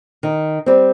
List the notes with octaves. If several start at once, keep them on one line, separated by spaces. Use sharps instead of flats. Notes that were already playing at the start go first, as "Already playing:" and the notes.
D#3
G3 C4